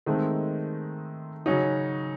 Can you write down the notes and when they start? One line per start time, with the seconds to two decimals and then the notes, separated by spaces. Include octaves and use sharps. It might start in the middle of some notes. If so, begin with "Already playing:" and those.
0.06 D#3 G#3 A3 C4 D#4
1.46 C#3 F#3 C#4 D#4 F#4